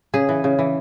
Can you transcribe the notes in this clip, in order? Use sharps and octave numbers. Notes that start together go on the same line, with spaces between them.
C#3 G#4
E3
C#3
E3